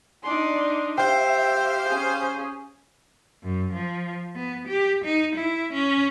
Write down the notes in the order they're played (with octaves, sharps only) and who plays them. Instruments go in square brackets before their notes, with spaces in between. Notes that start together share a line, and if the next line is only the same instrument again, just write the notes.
[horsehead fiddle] D4 D#4 [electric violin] D5 C6
[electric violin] G4 [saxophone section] C5 F5 [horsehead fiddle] E5 [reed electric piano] G5
[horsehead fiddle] C#4 G#4
[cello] F#2
F3
B3
G4
D#4
E4
C#4